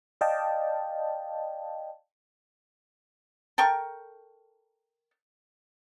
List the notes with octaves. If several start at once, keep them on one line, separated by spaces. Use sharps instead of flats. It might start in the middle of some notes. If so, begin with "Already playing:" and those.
D5 D#5 F5 G5 A5
A4 A#4 G5 C#6